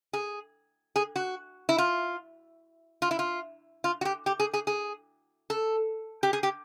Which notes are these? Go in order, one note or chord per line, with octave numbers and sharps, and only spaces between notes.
G#4
G#4
F#4
E4
F4
F4
E4
F4
F4
F#4
G4
G4
G#4
G#4
G#4
A4
G4
G#4
G4